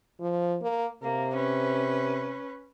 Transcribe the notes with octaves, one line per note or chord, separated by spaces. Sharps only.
F3
A#3
C3 A#3
C#4 B4